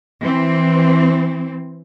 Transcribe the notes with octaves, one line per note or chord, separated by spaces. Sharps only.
E3 C4